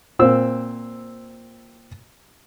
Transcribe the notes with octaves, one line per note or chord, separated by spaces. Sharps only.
A#2 C4 E6